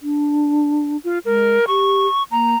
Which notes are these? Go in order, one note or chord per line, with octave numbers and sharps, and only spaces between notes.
D4
F4
G#3 A#4
G4 C#6
A#3 A#5